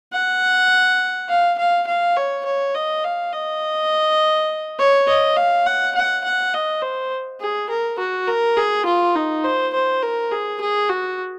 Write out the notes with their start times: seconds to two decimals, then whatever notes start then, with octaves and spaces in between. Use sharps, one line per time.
0.13 F#5
1.29 F5
1.58 F5
1.87 F5
2.16 C#5
2.46 C#5
2.75 D#5
3.04 F5
3.33 D#5
4.79 C#5
5.08 D#5
5.37 F5
5.66 F#5
5.95 F#5
6.24 F#5
6.54 D#5
6.82 C5
7.41 G#4
7.69 A#4
7.99 F#4
8.28 A#4
8.57 G#4
8.86 F4
9.16 D#4
9.44 C5
9.74 C5
10.03 A#4
10.31 G#4
10.61 G#4
10.90 F#4